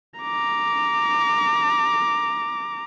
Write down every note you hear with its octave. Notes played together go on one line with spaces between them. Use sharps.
A#5 D6